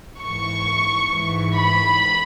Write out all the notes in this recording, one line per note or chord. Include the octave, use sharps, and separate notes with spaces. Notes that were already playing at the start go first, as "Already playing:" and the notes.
G#2 E3 C#6
G#2 E3
B5